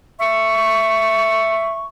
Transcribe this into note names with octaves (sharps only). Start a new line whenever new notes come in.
E5 C#6